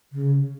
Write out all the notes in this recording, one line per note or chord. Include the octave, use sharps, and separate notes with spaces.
C#3